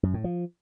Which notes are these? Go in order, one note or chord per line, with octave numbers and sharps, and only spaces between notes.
F#2
A2
F3